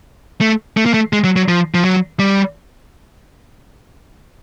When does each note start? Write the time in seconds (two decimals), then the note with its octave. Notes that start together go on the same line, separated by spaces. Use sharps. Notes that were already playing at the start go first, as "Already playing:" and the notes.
0.41 A3
0.77 A3
0.86 A#3
0.94 A3
1.13 G#3
1.24 F#3
1.36 F#3
1.48 F3
1.74 F3
1.85 F#3
2.19 G3